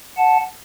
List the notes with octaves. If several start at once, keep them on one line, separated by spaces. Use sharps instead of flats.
F#5 A5